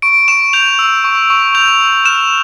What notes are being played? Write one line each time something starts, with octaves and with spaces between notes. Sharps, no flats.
C#6 D7
C#6 E7
G6 F7
E6
C#6
C#6
G6 F7
E6
F6 E7